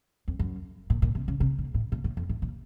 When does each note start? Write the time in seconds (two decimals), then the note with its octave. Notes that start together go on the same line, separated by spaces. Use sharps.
0.28 F2
0.39 F#2
0.90 A#2
1.02 A#2
1.15 C3
1.28 C#3
1.40 C3
1.59 A#2
1.74 A2
1.92 A#2
2.04 A2
2.17 F2
2.29 A2
2.42 A#2